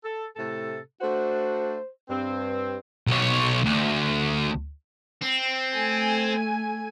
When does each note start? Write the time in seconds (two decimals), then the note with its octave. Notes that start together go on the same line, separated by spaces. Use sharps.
0.04 A4
0.36 A2 C3 A4
1.01 A3 D4 F#4 C5
2.09 G2 C4
3.07 B1 C#5
3.65 D2
5.22 C4
5.73 A3 G#5